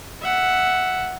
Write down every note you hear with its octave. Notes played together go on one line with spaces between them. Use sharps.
E5 F#5